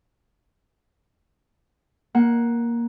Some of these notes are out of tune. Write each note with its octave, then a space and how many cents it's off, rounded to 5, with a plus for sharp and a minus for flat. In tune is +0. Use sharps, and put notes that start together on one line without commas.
A#3 +10 F#5 +0